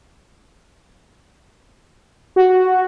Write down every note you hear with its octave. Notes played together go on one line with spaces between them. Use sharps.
F#4